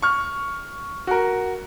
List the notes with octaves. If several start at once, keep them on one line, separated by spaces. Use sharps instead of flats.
C#6 F6
F#4 A#4